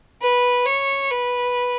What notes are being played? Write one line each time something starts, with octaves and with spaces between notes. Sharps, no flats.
B4
C#5
B4